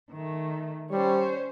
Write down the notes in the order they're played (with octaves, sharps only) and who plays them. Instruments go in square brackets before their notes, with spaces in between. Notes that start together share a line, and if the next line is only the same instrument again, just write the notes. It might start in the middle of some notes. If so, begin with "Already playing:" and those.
[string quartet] D#3 A3
[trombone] G3 [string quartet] C#4 C5 C#5